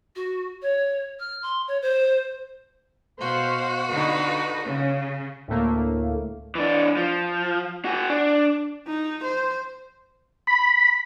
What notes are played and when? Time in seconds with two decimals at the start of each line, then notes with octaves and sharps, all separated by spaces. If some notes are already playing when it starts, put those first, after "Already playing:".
0.16 F#4
0.62 C#5
1.20 F6
1.42 C6
1.68 C#5
1.82 C5
3.21 B2 F#4 C5 F5
3.88 D3 D#4 B4
4.65 C#3 C#4
5.48 D2 A2 A3 A#3
6.55 E3 D4
6.97 F3
7.85 F#4 G#4
8.10 D4
8.87 D#4
9.23 C5
10.47 B5